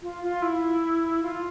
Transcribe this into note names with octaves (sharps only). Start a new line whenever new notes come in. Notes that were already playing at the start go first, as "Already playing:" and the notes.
F4
F4
E4
F4